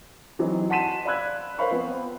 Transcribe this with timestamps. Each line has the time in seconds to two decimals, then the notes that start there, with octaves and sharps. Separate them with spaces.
0.39 E3 F#3 C4 D#4
0.70 F#5 A5 C6 B6 D#7 E7
1.05 D5 F5 B5 E6 F#6 G#6
1.58 A#4 C5 C#5 F5 B5 C#6
1.71 F3 B3 C4